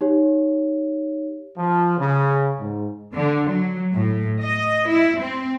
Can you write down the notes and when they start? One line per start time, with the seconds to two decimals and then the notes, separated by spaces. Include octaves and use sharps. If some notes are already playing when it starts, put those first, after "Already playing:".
0.01 D#4 G4 C#5
1.58 F3
1.99 C#3
2.60 G#2
3.14 D3
3.51 F#3
3.94 A2
4.43 D#5
4.89 E4
5.20 C4